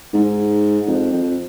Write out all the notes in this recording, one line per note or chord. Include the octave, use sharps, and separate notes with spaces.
G#2
F2
F2